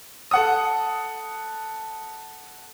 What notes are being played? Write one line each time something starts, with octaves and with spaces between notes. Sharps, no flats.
A4 F#5 D#6